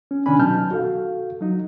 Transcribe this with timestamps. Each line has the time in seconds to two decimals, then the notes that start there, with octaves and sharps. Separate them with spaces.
0.11 C#4
0.26 C3 D#3 C#4 D4 G#5 B5
0.39 B2 F#3 D#4 A5 F6 G6
0.71 F#4 A4 F5
1.41 F#3 D#4